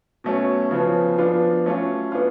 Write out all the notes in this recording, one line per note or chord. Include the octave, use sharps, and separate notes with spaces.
B2 F#3 A3 C#4
C#3 F3 B3
F3 B3 D4 F4
F#3 A3 C#4 F4
B3 D4 F4